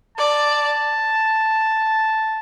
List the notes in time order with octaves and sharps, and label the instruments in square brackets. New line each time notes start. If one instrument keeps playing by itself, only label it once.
[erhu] D5 [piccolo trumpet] A5